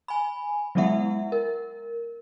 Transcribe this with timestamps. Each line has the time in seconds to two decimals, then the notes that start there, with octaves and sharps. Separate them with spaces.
0.08 G#5 B5
0.75 F#3 G#3 B3 E4 E5 F#5
1.32 A#4